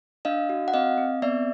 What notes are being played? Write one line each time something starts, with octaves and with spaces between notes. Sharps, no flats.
D4 D#5 F5
F#4
F#5
C4 D#5 F5
C4
B3 D5 E5